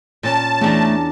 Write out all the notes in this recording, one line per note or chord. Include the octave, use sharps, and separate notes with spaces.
A#2 C#4 A5
E2 A3 D4 A#5